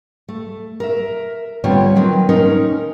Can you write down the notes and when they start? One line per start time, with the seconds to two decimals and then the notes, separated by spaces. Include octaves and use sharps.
0.28 A3
0.80 A#4 E5
1.64 D3 G3 B3 C4 F4 C#5
1.95 D#3 F#3 C4 A#4 B4
2.29 C#4 D#4 A#4